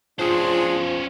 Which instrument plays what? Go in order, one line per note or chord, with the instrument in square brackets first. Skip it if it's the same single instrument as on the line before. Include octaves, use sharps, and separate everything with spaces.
[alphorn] F3 [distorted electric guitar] C#4 C5 [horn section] D4 G#4 [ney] F4